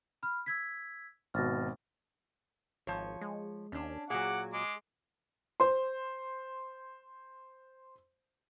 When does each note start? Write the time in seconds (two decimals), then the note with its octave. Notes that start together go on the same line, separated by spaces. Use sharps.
0.23 B5 F6
0.46 E6 G#6 B6
1.34 G#1 B2 F6 A6 A#6
2.87 G#1 F3 C#5
3.21 G#3
3.72 D#2 C#4 D4
4.10 A#2 F#3 G#4 F#5 D6
4.53 G#3 D6
5.60 C5 C6